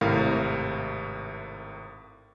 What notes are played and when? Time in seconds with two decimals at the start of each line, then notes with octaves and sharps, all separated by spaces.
0.01 G#1 A2 C3 A#4 F5